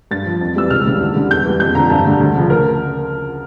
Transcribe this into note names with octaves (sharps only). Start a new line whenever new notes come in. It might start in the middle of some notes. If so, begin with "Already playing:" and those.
G2 A6
F3
F2
E3 G3 E6
C#2 F6
C#3 E3 G3
D2
D3 G3
E2 G6
E3 G3
F2 G6
D3 F3 A#5
G2 A5
D3 G3
D2
C#3 F3
A#4